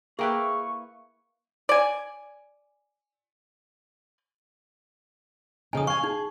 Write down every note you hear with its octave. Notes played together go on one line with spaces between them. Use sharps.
A#3 E4 G#4 B4 G5 C#6
D5 G#5
F2 C#3 D#4 G#5 D#6
F5 G#5 C#6
D#4 G#4